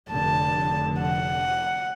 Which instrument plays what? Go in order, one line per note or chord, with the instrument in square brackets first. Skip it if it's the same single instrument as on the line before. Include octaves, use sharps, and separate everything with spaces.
[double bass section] F1 D3 [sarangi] A5
[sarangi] F#5